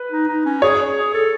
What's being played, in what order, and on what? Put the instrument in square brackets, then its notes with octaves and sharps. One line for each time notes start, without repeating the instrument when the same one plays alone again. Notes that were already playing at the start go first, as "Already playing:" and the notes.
Already playing: [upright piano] B4
[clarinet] D#4
D#4
C#4
[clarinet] G#4 [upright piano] C#5
[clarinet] G#4
A4